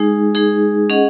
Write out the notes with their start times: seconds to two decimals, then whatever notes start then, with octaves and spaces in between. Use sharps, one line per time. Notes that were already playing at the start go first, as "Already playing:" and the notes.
Already playing: G#3 D#4 G#4
0.35 G#3 D#4 G#4
0.90 C#4 G#4 D#5 F#5